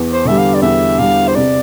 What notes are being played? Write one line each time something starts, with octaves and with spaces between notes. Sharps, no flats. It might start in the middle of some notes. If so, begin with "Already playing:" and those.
Already playing: E2
C5
D3 G3 E5
F5
D5
E2 E5
D3 G3 F5
C5
C3 D5